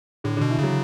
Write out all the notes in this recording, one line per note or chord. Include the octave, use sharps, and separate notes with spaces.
A2 D3
B2 D3
E3
C#3 F#3